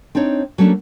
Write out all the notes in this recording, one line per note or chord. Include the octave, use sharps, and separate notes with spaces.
C4 D4 D#4 C#5
F#3 A3 A#3 C#4 D4